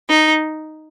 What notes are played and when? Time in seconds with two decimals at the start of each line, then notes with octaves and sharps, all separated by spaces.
0.09 D#4